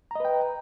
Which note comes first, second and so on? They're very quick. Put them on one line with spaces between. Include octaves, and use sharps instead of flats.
A#5 D#5 B4 G5